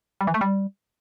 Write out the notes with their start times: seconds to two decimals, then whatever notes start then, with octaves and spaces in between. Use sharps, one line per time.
0.21 G3
0.27 E3
0.34 A3
0.41 G3